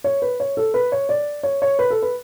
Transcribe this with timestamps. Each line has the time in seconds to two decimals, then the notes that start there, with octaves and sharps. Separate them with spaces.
0.04 C#5
0.22 B4
0.40 C#5
0.57 A4
0.74 B4
0.92 C#5
1.09 D5
1.43 C#5
1.62 C#5
1.79 B4
1.90 A4
2.02 B4